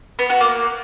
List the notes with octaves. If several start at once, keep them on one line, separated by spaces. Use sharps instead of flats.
B3
F#4
A#3